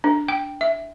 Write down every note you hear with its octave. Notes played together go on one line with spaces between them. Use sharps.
D4
G5
E5